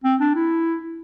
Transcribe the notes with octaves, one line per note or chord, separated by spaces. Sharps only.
C4
D4
E4